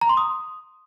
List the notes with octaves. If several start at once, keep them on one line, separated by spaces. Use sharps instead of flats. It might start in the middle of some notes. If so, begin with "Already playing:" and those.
A#5
C6
D#6